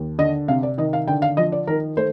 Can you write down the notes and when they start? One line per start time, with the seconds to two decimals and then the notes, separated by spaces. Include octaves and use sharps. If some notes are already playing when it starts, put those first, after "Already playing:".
Already playing: D#2
0.18 D3 D#5
0.48 C3 F5
0.63 D5
0.78 D#3 D#5
0.93 F5
1.08 D3 G5
1.22 F5
1.37 F3 D#5
1.52 D5
1.67 D#3 A#4
1.97 A3 C5